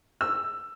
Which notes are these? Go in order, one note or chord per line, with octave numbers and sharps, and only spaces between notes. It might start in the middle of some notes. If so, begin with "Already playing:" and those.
E6